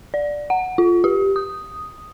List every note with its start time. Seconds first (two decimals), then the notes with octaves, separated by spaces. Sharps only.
0.14 D5
0.50 F#5
0.78 F4
1.04 G4
1.36 D#6